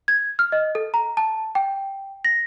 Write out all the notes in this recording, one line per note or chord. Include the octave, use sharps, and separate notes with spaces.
G#6
F6
D#5
A4
A#5
A5
G5
A#6